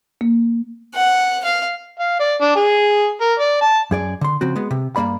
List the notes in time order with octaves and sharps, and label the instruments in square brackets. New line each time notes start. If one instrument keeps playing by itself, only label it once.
[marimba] A#3
[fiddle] F#5
F5
[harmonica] F5
D5
D4
G#4
A#4
D5
A5
[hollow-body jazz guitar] F#2 G#4 D5
D3 C6
C#3 F3 C4 F#4
G#3 B3
C3
G2 F3 A#3 D5 B5